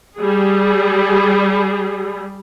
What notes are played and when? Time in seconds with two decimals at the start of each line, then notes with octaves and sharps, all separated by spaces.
0.17 G3 G#4